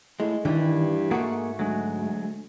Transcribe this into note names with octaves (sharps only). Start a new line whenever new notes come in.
A2 G#3
G2 D#3 E3 G3
G#2 A3 A#3 F#4 G#4
D2 F#3 G#3